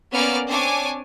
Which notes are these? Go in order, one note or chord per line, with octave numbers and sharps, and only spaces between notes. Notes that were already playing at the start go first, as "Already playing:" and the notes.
A#3 B3 C#4 D5 F6
C4 D4 C#5 G#5 D6